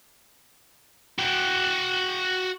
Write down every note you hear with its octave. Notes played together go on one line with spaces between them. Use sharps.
F#4 G5